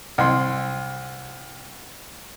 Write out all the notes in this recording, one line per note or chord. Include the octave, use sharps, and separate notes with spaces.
C2 C6